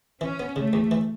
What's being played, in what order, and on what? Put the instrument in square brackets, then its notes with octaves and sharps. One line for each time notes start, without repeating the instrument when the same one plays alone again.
[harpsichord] E3 [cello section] C#4
[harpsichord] B3
[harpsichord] C#3 [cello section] A3
[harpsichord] E2
E3